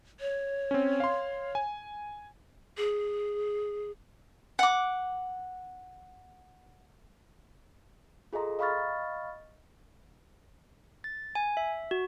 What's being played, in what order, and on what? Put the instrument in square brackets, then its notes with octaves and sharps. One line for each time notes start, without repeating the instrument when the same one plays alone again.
[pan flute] C#5
[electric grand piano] C4 C#4
F5 C6
G#5
[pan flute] G#4
[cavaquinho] F#5 D6
[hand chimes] F4 G#4 A4 D#5 A#5 C6
D#5 F5 B5 C#6 F6 A6
[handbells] A6
G#5
E5
F#4